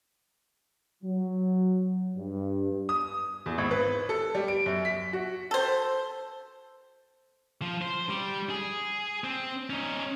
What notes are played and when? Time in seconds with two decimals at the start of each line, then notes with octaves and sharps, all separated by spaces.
1.03 F#3
2.17 G2
2.89 D#6
3.46 E2
3.58 G#1
3.71 B4
4.09 A4
4.35 G3
4.48 D7
4.66 F#2
4.85 B6
5.13 F#4
5.51 A4 C5
7.62 F3
7.82 C5
8.09 G3
8.50 G#4
9.24 C4
9.70 C#4 D#4